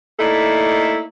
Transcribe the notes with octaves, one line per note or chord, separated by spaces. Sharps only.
A3 A#3 D#4 E4 A4 D5